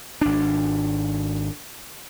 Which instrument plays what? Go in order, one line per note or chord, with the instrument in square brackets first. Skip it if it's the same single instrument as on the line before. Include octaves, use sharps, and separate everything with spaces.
[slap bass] G#1 D4